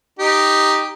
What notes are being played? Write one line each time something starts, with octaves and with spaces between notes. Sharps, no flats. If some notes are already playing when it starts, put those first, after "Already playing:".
D#4 G4